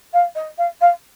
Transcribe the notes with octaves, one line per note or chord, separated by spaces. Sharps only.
F5
D#5
F5
F5